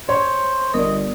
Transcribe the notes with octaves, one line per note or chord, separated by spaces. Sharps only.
C5 C#5
G1 A#4 D5 D#5